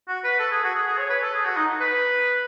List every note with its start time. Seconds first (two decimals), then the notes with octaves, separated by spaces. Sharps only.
0.08 F#4
0.24 B4
0.39 A4
0.51 G#4
0.63 F#4
0.75 G#4
0.87 G#4
0.98 C#5
1.10 B4
1.22 A4
1.34 G#4
1.45 F#4
1.56 D#4
1.81 B4